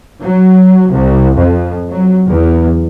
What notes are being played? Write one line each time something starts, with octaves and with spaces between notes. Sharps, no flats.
F#3
C2
F2
F#3
E2